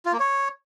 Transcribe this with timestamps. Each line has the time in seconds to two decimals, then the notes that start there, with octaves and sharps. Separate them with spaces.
0.06 F4
0.13 A#3
0.20 C#5